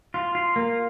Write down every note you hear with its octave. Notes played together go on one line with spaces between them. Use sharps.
F4
F4
A#3